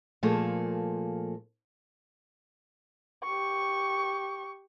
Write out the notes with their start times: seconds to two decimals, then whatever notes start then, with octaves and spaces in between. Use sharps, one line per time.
0.23 A#2 F3 A3 A#3 G#4 A4
3.24 G4 C#6